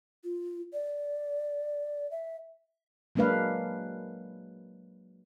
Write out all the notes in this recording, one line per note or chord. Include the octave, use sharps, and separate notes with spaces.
F4
D5
E5
F#3 G#3 A#3 D4 B4 F5